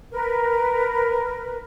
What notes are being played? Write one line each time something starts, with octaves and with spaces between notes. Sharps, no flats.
A#4 B4